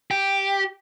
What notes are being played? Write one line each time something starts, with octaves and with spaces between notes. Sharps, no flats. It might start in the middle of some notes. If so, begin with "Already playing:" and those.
G4